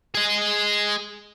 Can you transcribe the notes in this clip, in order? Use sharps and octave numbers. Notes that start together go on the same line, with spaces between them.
G#4 D#5